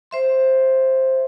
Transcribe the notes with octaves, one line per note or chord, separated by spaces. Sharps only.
C5 E5 C6